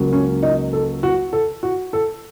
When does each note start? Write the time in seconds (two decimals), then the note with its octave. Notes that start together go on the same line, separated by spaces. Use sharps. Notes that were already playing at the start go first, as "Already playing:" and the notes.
Already playing: C#2 C#3 F#3 A#3
0.13 C#4
0.43 D#4
0.73 A4
1.03 F#4
1.33 A4
1.63 F#4
1.93 A4